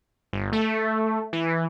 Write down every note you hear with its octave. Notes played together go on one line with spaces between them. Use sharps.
G1
A3
E3